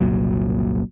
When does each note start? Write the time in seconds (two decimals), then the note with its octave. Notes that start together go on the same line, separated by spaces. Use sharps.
0.01 F#1 C2 A#2 F#3